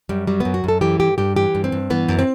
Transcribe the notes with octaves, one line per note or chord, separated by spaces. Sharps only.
F#2 G3
F#3 G3
F#2 B3
F#4
F#2 A4
E3 G4
G2 G4
G2 G4
E3 G4
G2
C4
G2
E3 B3
F#2
C4